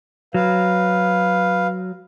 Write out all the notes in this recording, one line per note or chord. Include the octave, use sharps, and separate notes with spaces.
F#3 B4 F5